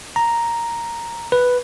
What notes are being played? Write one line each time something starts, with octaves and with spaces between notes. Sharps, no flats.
A#5
B4